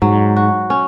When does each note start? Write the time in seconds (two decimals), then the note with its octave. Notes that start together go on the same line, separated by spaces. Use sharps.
0.02 G#2 F#3
0.36 F#4
0.70 C#4